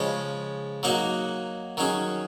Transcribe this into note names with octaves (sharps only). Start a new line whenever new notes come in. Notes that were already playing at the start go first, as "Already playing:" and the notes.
Already playing: C#3 F3 G#3 C#4
F#3 A#3 D#4 F#4
D#3 F#3 C#4 G#4